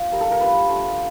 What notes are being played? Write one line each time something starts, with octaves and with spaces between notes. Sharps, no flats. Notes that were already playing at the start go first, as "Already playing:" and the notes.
Already playing: F4
G3 A#3 D#4 A#4
A4
A#4
G3 B3 D4 F4 B4
A3 D4 F4